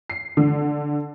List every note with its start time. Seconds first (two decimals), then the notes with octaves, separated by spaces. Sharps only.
0.10 C7
0.37 D3